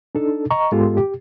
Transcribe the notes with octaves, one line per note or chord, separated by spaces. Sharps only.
D4 D#4 A4
D#5 A#5 C#6
G#2 G#3 B3 F4 G4 A4
G4